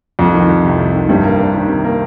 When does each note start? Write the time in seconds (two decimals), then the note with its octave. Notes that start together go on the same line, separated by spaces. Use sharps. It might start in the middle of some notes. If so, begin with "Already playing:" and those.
0.19 C2 F2
0.34 D#3
0.49 C2
0.64 C3
0.79 C2
0.94 D#3
1.09 G2 C3
1.23 A#3
1.39 D4
1.54 D#3
1.68 C3
1.84 A#3